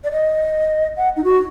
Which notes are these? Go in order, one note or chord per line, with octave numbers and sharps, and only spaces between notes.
D5
D#5
F#5
D#4
F#4